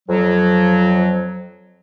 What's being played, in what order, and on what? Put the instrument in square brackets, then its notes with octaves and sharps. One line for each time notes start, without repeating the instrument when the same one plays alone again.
[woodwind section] F2 F#3